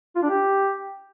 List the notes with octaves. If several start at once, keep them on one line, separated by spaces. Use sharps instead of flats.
F4
D4
G4